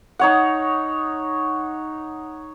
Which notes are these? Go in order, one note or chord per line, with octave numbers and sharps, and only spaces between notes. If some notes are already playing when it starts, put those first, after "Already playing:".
D#4 C#5 F#5